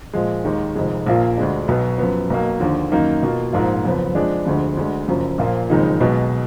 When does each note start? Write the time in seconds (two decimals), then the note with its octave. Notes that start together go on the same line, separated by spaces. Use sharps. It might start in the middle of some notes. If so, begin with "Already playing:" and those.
0.13 A#2 F3 G#3
0.45 D#2 D#3 G#3
0.75 F1 F2 D#3 G#3
1.06 A#1 A#2 F3 A#3 F4
1.37 D2 D3 G#3 D4
1.68 B1 B2 F#3 B3
1.98 F#2 F3 B3
2.30 B1 B2 A#3
2.60 D#2 D3 F3
2.92 F#2 D#3 A#3 D#4
3.23 B2 A#3 F4
3.53 A#1 G#2 F3 A#3 F4
3.84 F#1 F2 F3 B3
4.15 F2 F3 G#3 D4 G#4
4.46 D2 D3 F3 G#3
4.77 D2 D3 G#3
5.08 F#1 F#2 F3
5.38 A#1 A#2 F3 A#3 F4
5.70 F#1 F2 D#3 G#3 D#4
6.00 B1 B2 G#3 B3